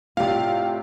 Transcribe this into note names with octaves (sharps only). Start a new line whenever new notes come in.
A2 C3 F4 G4 D5 F5